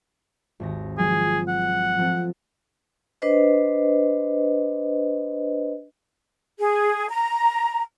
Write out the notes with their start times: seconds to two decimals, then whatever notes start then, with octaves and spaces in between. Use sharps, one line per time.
0.60 G#1 D#2 A#6
0.98 F3 F#3 G#3 G#4
1.48 F#5
1.98 F3 C4 A4
3.22 D4 B4 C5 D#5
6.59 G#4
7.09 A#5